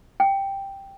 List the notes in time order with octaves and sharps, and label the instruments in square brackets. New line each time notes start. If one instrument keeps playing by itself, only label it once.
[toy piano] G5